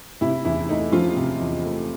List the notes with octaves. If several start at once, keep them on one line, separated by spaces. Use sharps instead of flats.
C3 E4
E2 E4
A3 D#4
F3 F4
C3
E2
A3